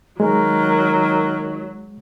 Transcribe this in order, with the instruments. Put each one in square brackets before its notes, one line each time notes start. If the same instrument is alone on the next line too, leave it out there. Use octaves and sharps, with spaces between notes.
[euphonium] D#3 [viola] F#3 [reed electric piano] G#3 [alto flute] A#4